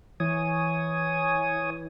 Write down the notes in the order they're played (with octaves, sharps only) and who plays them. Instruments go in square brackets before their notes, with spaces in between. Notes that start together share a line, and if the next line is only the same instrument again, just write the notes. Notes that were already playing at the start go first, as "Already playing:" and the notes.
[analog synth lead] E3 [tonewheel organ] C#5 G#5 D#6